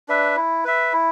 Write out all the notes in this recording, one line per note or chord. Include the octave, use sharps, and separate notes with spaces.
D4 B4 E5
E4
B4 E5
E4